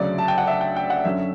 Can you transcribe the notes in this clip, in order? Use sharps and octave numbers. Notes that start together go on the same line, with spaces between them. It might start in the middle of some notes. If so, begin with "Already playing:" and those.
Already playing: D2 C#3 F#3 D5
A5
G5
F#5
E5
G5
G5
F#5
F#2 D3 F#3 C#4 E5